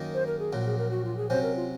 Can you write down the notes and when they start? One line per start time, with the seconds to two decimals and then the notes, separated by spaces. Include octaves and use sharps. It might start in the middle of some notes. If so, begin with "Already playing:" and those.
Already playing: F#2 D#3 A#3 D#4
0.14 C5
0.27 A#4
0.39 G#4
0.53 A#1 A#2 F#3
0.66 G#4
0.78 A#4
0.91 F#4
1.04 F4
1.17 G#4
1.30 C3 F#3 C#4 C5
1.42 A#4
1.56 F4